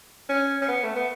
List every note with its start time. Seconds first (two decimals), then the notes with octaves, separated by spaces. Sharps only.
0.29 C#4
0.62 C#4
0.68 B3
0.84 A3
0.96 B3